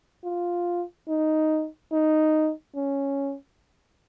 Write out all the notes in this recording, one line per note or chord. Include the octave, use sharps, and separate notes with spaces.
F4
D#4
D#4
C#4